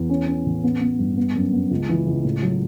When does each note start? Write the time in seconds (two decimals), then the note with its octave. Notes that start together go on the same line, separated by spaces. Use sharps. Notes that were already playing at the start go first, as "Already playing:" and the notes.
Already playing: E2
0.10 C#4
0.27 C#4
0.46 A1
0.64 B3
0.81 B3
0.99 G2
1.17 B3
1.35 F#2
1.52 B3
1.71 C#2
1.89 E3
2.06 C#2
2.25 A2
2.42 F#3